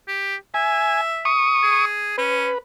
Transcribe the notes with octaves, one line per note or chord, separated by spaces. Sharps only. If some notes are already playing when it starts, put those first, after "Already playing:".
G4
E5 G#5
C#6 D#6
G#4
C#4 B4